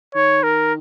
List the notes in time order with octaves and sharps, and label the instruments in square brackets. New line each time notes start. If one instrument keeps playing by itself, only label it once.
[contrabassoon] D#3 [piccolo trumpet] C#5
[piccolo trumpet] A#4